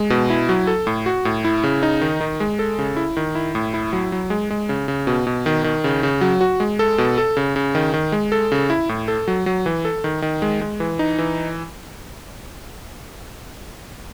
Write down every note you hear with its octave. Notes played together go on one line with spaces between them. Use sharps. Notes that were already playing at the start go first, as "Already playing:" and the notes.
Already playing: G#3
B2
E4
F#3
A4
A2
F#4
A2
E4
C#3
D#4
D#3
D#3
G#3
A4
C#3
E4
D#3
E4
A2
E4
F#3
F#3
G#3
G#3
C#3
C#3
B2
B2
D#3
D#3
C#3
C#3
F#3
F#4
G#3
A4
B2
A4
C#3
C#3
D#3
D#3
G#3
A4
C#3
E4
A2
A4
F#3
F#3
E3
A4
D#3
D#3
G#3
G#3
E3
D#4
E3